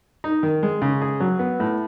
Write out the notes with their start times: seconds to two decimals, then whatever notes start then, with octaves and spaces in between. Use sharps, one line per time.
0.24 D#4
0.43 D#3
0.63 G#3
0.82 C#3
1.02 G#4
1.20 F#3
1.39 B3
1.60 A2